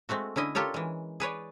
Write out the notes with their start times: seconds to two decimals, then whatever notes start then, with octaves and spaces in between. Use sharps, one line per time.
0.09 G#3 A3 C4 F#4
0.36 D3 C#4 E4 D#5
0.55 F4 G4 A4 A#4 C#5
0.74 E3 G#3
1.20 G#4 B4 C#5 D5